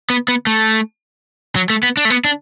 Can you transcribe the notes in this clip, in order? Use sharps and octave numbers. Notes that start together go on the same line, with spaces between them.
B3
B3
A3
F#3
A3
B3
D4
A3
B3
D4